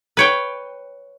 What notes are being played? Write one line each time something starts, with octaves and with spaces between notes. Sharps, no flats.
B4 C#5 G5